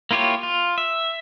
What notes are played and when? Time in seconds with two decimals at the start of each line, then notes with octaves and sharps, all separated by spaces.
0.11 A#3 E4 F4 G4 C#5
0.43 F4
0.78 E5